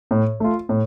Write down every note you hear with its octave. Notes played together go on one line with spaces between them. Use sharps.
A2
A3 F4
A2